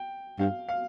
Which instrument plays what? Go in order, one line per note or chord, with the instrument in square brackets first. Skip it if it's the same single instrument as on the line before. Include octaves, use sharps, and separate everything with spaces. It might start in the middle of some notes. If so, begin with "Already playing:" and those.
Already playing: [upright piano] G5
[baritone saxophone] G2 [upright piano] F5
[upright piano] F5